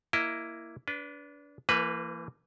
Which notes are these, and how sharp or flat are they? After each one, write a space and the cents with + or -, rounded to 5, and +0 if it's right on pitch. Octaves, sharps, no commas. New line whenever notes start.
A#3 +0 E4 +10 D#5 +0
D4 -25 B4 +0
E3 +30 A#3 -25 B4 +0